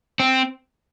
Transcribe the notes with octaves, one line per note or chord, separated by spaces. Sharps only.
C4